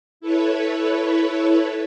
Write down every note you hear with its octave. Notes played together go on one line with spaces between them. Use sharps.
E4 A4 B4 C#5